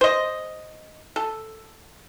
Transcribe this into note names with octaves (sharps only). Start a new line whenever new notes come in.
C5 D#5
A4